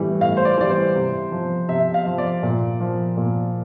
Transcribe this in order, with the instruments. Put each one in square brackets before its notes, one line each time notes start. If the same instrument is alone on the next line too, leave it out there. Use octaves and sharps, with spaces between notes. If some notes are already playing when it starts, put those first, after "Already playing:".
Already playing: [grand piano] A2 E3 G3
A2 F5
C5
D5
E3 G3 D5
C5
C3
F3
C3 E5
F5
F3
D5
A#2
F3
A#2